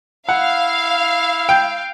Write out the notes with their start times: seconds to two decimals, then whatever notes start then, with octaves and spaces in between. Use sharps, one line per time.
0.29 E4 F5 F#5
1.49 G5